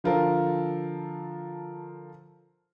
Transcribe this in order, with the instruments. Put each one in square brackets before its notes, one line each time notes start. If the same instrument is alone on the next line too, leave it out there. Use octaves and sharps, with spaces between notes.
[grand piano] D3 F3 F4 A4 A#4